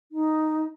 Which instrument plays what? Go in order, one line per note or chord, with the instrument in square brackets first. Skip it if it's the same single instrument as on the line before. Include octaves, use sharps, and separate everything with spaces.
[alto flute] D#4